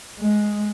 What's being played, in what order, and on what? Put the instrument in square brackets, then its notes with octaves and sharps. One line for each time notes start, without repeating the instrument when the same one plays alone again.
[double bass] G#3